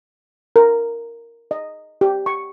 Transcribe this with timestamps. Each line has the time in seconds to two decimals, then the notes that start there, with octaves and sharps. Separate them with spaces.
0.56 A#4
1.51 D#5
2.01 G4
2.26 C#6